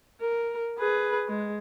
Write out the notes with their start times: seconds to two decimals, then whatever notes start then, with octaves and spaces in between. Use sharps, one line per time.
0.21 A#4
0.78 G#4 B4
1.28 G#3